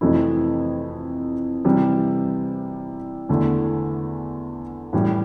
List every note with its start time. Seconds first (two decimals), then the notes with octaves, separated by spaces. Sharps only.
0.01 F2 C3 E3 A3 E4
1.65 C3 E3 G3
3.29 E2 D3 A3 E4
4.93 A2 E3 G3